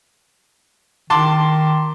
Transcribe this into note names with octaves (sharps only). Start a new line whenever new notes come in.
D#3 A5 C6 D6